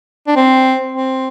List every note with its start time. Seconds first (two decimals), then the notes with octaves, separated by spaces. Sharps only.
0.28 D4
0.36 C4
0.92 C4